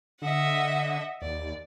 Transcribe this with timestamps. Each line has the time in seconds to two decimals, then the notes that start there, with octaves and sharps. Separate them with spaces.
0.22 D3 D#5 E5 F#5
1.22 D#2 D5